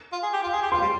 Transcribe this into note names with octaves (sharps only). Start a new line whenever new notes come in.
F4
G#4
G4
F4
G#4
G4
F4 C6
G3